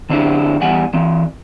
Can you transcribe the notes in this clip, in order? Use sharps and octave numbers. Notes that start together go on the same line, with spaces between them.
D3 C4 D4 E4 G4
E2 E3 G3 F#5 G#5
E3 C4